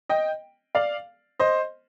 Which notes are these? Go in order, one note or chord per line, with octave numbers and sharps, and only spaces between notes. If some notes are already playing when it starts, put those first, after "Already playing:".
D#5 G5
D5 F5
C5 D#5